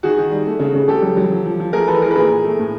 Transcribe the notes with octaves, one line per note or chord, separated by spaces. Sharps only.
D#3 F#4 G#4
D#3
G3
A3
C#3
C#3
C#3 G4 A4
F#3
F#3
F3
F3
F3
A3 G#4 A#4
E3 A4 B4
E3 G#4 A#4
B4
A#2 G#4 A#4
A#2
A3
A2